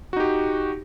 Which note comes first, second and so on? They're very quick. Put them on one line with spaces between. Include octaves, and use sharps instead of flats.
F#4 D#4 G4